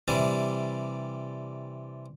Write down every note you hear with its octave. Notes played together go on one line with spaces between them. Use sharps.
C3 E3 G3 D4